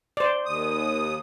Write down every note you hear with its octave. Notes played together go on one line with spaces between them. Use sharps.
C5 D5
D#2 D#6